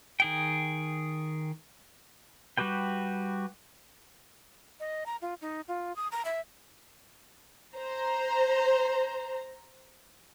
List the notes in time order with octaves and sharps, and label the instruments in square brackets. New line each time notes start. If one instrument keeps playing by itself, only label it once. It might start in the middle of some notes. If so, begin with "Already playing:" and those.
[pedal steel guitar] D#3 G#4 G5
G3 F#4 G4 B4 G5
[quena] D#5
A#5
F4
D#4
F4
D#6
A#5
E5
[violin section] C5 A#5